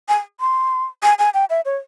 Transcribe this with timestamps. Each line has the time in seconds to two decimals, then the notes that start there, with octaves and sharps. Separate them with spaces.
0.08 G#5
0.40 C6
1.03 G#5
1.19 G#5
1.34 G5
1.50 E5
1.65 C#5